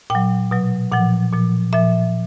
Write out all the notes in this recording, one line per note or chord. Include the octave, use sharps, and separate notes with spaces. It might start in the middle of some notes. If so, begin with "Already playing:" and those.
A#2 G5
F#3
B2 F#3
A#2 F3 F#5
A#2 F3
A#2 F3 E5